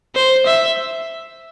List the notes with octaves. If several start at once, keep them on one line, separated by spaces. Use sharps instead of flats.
C5
E5